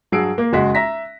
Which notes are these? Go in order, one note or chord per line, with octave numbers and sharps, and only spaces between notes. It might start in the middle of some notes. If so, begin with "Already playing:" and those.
G2 F#3 G#4 E6 C7 D7
A#3
F#1 G#3 F#4 B6
E5 A#5 A#6 B6